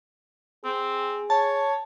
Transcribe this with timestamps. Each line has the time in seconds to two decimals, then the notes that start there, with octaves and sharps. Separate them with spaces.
0.64 C4 G#4
1.30 C#5 A5